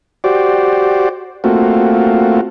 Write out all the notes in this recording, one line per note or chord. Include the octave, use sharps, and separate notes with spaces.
F#4 G4 C5 D5
A3 A#3 C4 F4 F#4